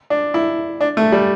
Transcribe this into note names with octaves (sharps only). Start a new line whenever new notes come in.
D4
E4
D4
A3
G3